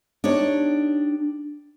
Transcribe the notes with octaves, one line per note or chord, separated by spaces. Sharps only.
D4 D#4 G4 C#5